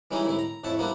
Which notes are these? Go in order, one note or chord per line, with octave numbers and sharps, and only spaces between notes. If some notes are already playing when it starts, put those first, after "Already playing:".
E3 G3 G#3 C#4 D#4 E4
C2 A2 D#3 E4
A#5
F2 A2 E4 A5 C#6
F3 G3 A#3 B3 D4 E4